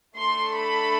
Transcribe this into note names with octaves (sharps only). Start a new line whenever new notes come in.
A3 D4 A4 C6
B5